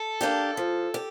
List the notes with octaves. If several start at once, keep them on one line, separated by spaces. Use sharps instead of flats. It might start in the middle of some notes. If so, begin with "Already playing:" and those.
Already playing: A4
A#3 D4 G4
F3
G4